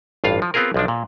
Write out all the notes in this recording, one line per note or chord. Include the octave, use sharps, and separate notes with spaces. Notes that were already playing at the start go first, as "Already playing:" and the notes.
A1 G2 F4 F5
F3
B3 C4 F4 G#4 A#4
B1 F3 D4
A#2